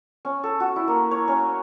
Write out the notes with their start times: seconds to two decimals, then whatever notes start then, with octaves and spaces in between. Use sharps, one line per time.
0.25 C#4
0.43 A4
0.60 F#4
0.76 E4
0.88 A#3
1.11 C#5
1.28 C#4